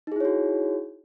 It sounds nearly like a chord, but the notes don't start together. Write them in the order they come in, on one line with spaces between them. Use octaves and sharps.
D#4 G#4 E4 C#5 F#4